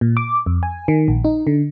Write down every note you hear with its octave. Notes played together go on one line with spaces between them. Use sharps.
A#2
D6
F2
G#5
D#3
A#1
D#4
D3